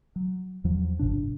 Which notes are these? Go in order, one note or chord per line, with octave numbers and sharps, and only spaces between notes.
F#3
E2 F3 F#3
G1 A2 C3 D4